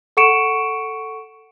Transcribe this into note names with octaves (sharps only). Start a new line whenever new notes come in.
A4 F#5 C#6 C#7 D7 E7